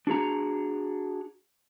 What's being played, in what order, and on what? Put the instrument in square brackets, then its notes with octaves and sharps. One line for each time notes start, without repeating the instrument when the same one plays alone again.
[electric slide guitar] D4 F#4 G#4 A#5